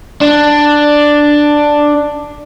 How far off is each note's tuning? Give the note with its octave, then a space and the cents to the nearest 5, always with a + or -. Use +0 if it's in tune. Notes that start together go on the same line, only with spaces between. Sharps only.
D4 +5